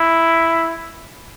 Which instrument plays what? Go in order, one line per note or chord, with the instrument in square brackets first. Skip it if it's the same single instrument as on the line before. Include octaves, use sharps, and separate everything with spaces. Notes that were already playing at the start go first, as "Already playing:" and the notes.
Already playing: [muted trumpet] E4